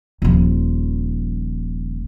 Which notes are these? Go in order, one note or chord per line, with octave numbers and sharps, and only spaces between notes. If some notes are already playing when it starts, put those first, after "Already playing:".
D#1 F3